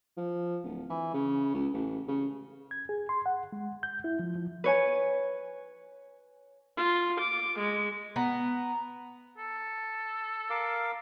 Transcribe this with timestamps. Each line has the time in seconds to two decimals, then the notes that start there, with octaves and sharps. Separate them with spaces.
0.17 F3
0.63 D1
0.90 E3
1.14 C#3
1.54 C#2
1.73 A1
2.08 C#3
2.71 G#6
2.89 G#4
3.09 C6
3.26 F#5
3.53 G#3
3.83 G6
4.04 E4
4.19 F3
4.35 F3
4.64 B4 C#5 G#5
6.77 F4
7.20 D6
7.59 G#3
8.16 B3 A#5
9.38 A4
10.50 A#4 F5 D6